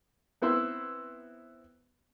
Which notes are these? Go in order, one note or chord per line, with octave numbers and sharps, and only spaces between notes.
B3 C4 E4 B4 C5